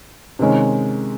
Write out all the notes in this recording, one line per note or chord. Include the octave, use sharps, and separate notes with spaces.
C3 D#3 G#3 C#4